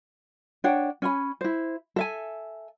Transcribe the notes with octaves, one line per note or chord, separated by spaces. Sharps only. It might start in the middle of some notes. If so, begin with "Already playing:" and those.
D4 C#5 F#5 G5
C#4 G#5 B5
E4 C5
A4 E5 G#5